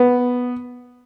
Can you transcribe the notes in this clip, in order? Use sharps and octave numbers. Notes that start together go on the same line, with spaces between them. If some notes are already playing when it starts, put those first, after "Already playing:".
Already playing: B3